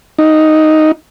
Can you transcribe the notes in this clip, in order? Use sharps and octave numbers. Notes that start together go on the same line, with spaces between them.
D#4